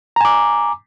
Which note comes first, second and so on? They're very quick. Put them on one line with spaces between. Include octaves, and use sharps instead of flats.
A#5 G#5 D6